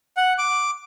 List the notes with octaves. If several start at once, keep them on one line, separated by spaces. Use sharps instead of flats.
F#5
D6